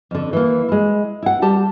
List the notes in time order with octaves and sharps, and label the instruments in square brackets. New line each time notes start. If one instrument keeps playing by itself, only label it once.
[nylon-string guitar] F2 D3
E3 A#3
G#3 E4
E4 F#5
G3 G4 A5